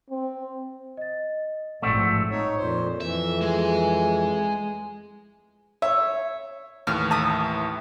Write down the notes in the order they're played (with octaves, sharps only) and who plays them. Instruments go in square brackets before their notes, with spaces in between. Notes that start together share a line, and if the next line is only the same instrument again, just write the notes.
[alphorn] C4
[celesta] D#5 A6
[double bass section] A1 G#2 F3 [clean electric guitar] A3 C4 [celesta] D5 F#5
[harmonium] D#4 C#5
F2 A#2 C5
[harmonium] F2 E3 [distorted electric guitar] E5
[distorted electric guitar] G#3
[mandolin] C#5 [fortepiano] E5
[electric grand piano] D#2 A2 E3 [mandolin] F6
[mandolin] E5 D#6 [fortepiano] A5